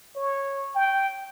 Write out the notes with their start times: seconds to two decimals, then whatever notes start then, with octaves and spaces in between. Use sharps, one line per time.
0.16 C#5
0.75 G5